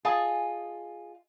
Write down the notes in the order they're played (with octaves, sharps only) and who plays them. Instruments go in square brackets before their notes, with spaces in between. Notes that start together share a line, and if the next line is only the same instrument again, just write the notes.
[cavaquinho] F4 D#5 A5 [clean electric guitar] G#4